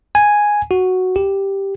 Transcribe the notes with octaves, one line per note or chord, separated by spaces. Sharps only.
G#5
F#4
G4